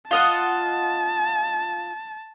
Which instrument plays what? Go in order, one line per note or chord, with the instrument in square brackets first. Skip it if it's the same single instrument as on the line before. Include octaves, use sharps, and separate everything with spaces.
[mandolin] F4 D#5 F#5 [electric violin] A5